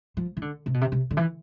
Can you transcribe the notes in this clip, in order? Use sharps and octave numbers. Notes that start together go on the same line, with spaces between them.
F3
E3
D3
C3
B2
C3
C3
D3
E3